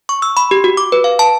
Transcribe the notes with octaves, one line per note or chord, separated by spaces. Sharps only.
C#6
E6
B5
G4
F#4
D6
B4
F5
A5